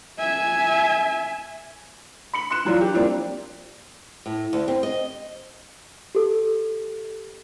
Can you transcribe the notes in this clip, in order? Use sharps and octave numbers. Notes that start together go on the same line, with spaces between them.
E5 G#5
B5 C#7 F#7
C6 F#6 C#7 E7
E3 F#3 D4 F4
G4
F3 G3 A#3 C4 D4 E4
A2
D2
C4
D#5
G4 A4